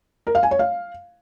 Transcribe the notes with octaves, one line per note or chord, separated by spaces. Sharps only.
A#4
F5
G#5
C#5
F5